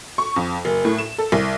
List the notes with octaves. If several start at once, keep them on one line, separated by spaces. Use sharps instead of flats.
C#6
F2
F#1
A2
E7
A4
C2